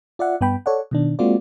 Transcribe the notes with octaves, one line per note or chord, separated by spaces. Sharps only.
F4 D5 E5 F#5
G2 B3 G5 B5
A4 C#5 D5 F#5
B2 D#3 D4
G#3 A#3 C4 F4 F#4 D5